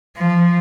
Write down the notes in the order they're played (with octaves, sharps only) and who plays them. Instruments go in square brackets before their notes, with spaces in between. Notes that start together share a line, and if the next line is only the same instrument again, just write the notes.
[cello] F3